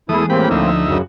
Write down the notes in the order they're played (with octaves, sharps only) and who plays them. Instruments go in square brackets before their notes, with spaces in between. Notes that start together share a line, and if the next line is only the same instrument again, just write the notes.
[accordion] E2 E4 [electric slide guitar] E3 G#3 G#4 [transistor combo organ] A3 D#6
[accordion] A2 A#3 C4 [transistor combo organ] G4 B5
[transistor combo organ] D2 D#4 E5 [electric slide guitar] F3
[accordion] F#2 C#3 [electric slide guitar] F#4